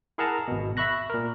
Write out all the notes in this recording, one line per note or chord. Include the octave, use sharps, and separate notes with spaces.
E4 G#4 A#4 F#5 A5 A#5
G#1 B2
E5 B5 C#6 F#6 A#6
A#2 A#4